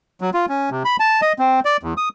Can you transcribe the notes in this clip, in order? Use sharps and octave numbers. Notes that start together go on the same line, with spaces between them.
F#3
F4
C#4
C3
B5
A5
D#5
C4
D5
E2
D#6